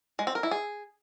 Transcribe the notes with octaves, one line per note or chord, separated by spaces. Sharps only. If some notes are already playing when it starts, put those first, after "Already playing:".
G#3
C4
A#4
E4
G#4